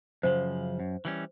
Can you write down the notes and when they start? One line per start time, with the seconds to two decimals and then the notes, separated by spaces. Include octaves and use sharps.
0.23 F#2 C#3 F3 C5
0.80 F#2
1.05 E3 G3 C#4